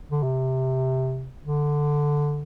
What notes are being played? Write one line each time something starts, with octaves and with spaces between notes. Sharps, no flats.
D3
C3
D3